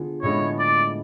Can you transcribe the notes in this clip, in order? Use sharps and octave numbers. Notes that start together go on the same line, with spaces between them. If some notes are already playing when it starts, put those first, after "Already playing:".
Already playing: D3 B3 F4 G#4
A2 G#3 B3 D4 C#5
D5